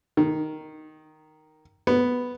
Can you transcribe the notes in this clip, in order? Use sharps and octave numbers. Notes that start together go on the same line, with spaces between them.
D#3
B3